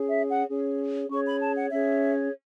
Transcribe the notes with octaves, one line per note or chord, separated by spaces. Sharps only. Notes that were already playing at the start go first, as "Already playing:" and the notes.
Already playing: C#4 G#4 C#5
E5
F#5
C#4 G#4 C#5
C#4 G#4 C#5 C#6
B5
A5
F#5
C#4 G#4 C#5 E5